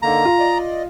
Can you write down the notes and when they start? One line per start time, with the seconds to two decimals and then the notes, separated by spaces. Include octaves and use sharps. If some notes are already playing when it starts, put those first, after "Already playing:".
0.02 D3 D#3 A#3 A#5
0.25 F4
0.39 D5 D#5